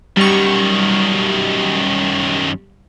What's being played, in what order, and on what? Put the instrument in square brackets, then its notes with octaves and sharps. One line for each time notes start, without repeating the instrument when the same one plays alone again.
[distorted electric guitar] F#2 D#3 [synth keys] G3 C#6